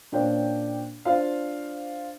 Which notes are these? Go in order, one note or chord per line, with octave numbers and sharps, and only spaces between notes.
A#2 C#4 D4 C5 G5
D4 F4 C5 F5